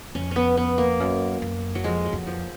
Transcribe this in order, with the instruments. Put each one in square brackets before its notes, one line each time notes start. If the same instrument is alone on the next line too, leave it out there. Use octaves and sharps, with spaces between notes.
[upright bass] F2 [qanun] C#4
[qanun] B3 C#4
B3
A#3
[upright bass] F#2
F#2
[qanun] F#3
[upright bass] F2 [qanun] G#3
[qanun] F#3
[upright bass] F2
[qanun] F3